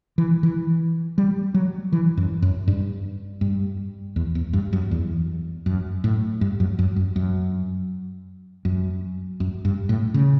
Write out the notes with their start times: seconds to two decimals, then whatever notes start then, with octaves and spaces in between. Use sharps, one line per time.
0.18 E3
0.43 E3
1.18 G3
1.54 F#3
1.92 E3
2.17 F#2
2.42 F#2
2.68 G2
3.41 G2
4.16 E2
4.35 E2
4.53 G2
4.73 F#2
4.91 E2
5.66 F#2
6.04 A2
6.41 G2
6.60 F#2
6.79 F#2
6.96 F#2
7.16 F#2
8.65 F#2
9.40 F#2
9.65 G2
9.89 A2
10.14 C#3